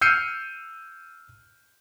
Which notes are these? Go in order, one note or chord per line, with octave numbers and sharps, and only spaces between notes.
E6 F6 G6 C7 C#7 D#7